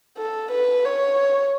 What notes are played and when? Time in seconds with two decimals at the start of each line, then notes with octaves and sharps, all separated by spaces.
0.18 A4
0.51 B4
0.85 C#5